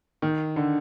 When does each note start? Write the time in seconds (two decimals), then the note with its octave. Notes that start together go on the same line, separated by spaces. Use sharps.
0.22 D#3
0.56 D3